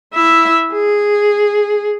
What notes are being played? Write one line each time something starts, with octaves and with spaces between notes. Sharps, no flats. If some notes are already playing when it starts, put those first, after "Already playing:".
E4 E5
G#4